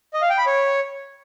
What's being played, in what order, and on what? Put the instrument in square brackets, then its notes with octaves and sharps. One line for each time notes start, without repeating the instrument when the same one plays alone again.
[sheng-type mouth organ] D#5
F5
G5
B5
C#5